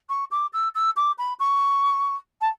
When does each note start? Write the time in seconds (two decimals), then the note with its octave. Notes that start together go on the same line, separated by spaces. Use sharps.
0.09 C#6
0.31 D6
0.53 E6
0.75 E6
0.96 D6
1.18 B5
1.39 C#6
2.41 A5